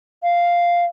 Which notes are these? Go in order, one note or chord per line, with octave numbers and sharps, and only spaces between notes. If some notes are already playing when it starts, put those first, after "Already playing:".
F5